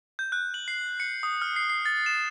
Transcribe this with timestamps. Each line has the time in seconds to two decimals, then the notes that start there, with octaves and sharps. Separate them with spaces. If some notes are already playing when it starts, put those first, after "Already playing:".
0.19 G6
0.32 F#6
0.54 F#7
0.68 C7
1.00 C#7
1.23 D#6
1.42 F6
1.56 C7
1.70 C7
1.85 A6
2.06 E7